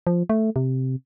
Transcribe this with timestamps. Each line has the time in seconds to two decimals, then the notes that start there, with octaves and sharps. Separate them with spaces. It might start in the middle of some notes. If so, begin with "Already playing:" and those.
0.07 F3
0.30 A3
0.56 C3